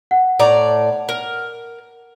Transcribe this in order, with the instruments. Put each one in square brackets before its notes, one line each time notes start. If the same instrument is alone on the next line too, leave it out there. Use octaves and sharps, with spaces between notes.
[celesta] F#5
[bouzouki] A2 D5 A#5
A#4